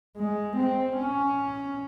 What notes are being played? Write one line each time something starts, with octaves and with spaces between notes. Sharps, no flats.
G#3
C4
C#4